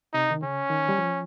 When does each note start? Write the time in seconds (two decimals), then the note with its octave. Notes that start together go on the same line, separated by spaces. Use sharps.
0.13 C3 D#4
0.31 D#3
0.43 C#3 C#4
0.70 D#3
0.89 G3
0.98 F3